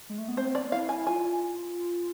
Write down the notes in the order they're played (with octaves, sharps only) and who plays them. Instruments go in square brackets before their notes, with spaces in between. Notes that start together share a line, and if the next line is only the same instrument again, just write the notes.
[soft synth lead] G#3
A3
B3
[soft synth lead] C4 [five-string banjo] C5
[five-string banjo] D5
[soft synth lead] E4 [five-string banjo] F5
[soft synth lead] E4 [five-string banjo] G#5
[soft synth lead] F4 [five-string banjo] G#5